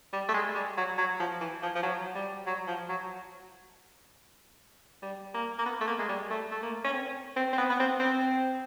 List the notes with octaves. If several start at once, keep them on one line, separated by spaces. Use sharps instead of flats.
G3
A3
G#3
G3
F#3
F#3
F3
E3
F3
F3
F#3
G3
F#3
F3
F#3
G3
A#3
A#3
B3
A3
A#3
G#3
G3
A3
A3
A#3
C#4
C4
C4
C4
B3
B3
C4
C4